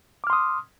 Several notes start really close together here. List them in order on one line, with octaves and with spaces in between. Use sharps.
D6 F6 C6 D#6